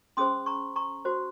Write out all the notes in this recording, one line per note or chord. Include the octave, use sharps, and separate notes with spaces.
C#4 G#4 C5 C6 D#6
A#5 C#6
A#5 C#6
F#4 C5